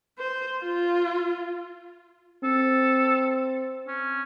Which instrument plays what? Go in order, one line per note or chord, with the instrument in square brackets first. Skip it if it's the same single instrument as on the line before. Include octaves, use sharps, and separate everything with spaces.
[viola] C5
F4
[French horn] C4 [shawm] A4
[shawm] C#4